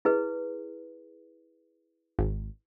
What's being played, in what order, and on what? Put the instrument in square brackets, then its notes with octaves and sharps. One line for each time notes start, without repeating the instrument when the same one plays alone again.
[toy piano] E4 G#4 B4
[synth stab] G#1